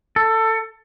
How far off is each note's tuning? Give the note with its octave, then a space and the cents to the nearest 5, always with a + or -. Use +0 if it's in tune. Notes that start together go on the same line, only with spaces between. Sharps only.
A4 +20